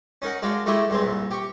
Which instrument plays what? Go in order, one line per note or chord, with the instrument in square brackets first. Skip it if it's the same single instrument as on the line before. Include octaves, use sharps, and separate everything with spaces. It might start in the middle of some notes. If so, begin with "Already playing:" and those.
[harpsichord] C#4 D#4 A#4 F#5
G#3 D4 F#4 F5 G5
G#3 A3 E4 G4 D#5 C#6
G2 G#3 C4
C2 A#2
G4 C#6